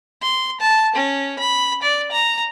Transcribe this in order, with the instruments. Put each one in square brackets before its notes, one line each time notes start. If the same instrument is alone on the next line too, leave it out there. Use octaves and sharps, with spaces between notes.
[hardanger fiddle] C6
A5
C#4
B5
D5
A#5